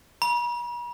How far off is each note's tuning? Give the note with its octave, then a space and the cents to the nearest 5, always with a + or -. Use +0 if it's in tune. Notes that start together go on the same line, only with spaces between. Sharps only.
B5 -45